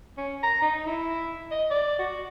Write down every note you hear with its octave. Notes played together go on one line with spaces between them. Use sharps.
C#4
A#5
D#4
E4
D#5
D5
F#4